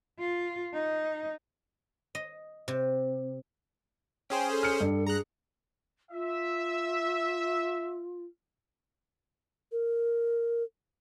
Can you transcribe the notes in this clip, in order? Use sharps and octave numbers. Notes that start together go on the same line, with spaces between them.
F4
D#4
D#5
C3
C#4 G#4 C5 G5
A4
F6 C#7
G2
G#4 A#5 F#6
F4 E5
A#4